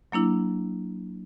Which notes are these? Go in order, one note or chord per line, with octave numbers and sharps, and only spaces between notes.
F#3 A#3 D4 E4